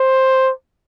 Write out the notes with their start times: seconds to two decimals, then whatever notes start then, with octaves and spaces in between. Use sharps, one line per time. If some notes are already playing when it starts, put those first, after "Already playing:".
Already playing: C5